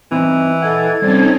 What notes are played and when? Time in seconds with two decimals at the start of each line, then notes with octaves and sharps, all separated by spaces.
0.12 E3 C4 D#4 E4
0.62 A4 D#5 F#5 G#6
1.02 G3 C4 C#4 D#4 C5 D5